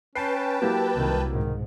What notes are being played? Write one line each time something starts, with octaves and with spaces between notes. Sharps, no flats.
C#4 B4 G5 A5 C7
F#3 A#3 E4 G4
C2 D#3
G#2 B2 D#3